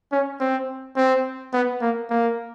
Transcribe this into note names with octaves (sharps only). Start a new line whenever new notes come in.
C#4
C4
C4
B3
A#3
A#3